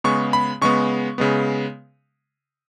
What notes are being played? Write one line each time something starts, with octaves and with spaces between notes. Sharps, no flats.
C#3 G#3 B3 C#6
B5
C#3 G#3 B3 C#6
C#3 G#3 B3